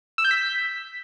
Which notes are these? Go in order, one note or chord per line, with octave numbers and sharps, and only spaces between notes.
E6
G6
B6